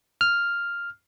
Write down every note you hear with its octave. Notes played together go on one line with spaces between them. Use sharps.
F6